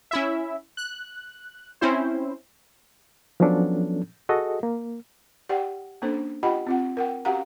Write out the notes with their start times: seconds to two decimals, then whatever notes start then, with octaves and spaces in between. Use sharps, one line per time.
0.11 C#4 E4 E5
0.77 F#6
1.81 C4 C#4 E4 C5
3.40 F3 F#3 B3 C#4 D4 A4
4.29 F#4 G#4 A4 D#5
4.63 A#3
5.49 G4 D5 F#5 G5
6.02 A#3 C#4 D4 A4 C5
6.43 F4 G4 D#5 F#5 G5 B5
6.67 C4 F4 F#5
6.97 A#4 F#5 G5
7.25 C#4 F#4 G4 F5 F#5 A#5